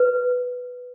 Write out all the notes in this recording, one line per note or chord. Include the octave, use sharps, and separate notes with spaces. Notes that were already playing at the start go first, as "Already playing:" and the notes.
Already playing: B4